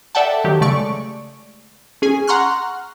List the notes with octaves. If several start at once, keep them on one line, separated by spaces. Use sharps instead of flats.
A4 D5 E5 F#5 G5 A5
D#3 F#3 G4
C#3 G#3 A3 D5 C#6 D7
C#4 G#4 G#5
F#5 A#5 C6 C#6 F6 F#6